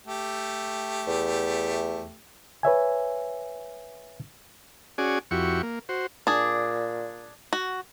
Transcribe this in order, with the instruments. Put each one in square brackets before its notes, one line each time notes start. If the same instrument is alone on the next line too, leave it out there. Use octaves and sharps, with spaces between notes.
[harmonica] A3 G4
[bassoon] E2
[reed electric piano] B4 C#5 E5 G#5
[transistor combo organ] C#4 F#4 G#4 D5 G#5
F2 E4 F#4 G4 C#6
A#3
F#4 C5
[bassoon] A#2 [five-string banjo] D4 G#4
[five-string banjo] F#4